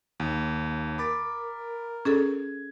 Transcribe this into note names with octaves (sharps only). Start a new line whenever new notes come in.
D#2
A#4 B5 D6 A6
C#4 G#4 A4 G#6